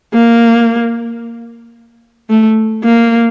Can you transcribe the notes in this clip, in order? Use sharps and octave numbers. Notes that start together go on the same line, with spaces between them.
A#3
A3
A#3